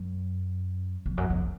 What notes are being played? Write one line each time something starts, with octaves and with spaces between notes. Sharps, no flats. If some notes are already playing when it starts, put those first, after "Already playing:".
Already playing: F#2
F2
F#2
F2